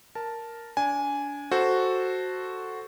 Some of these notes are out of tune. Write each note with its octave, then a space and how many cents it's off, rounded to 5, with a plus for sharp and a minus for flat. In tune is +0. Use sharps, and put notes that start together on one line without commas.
A#4 +0 A5 +0
D4 -30 G#5 +0
F#4 +0 A4 +0 C5 +0